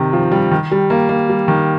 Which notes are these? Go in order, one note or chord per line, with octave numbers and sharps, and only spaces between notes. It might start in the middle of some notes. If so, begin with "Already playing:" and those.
Already playing: C3 D#3
F3
G3
D#3
G3
A#3
A#3
G3
D#3